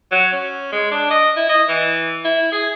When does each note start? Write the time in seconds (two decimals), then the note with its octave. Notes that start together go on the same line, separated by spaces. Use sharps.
0.11 F#3
0.32 C#4
0.72 G#3
0.92 D4
1.11 D#5
1.36 E4
1.49 D#5
1.69 E3
2.25 E4
2.52 G#4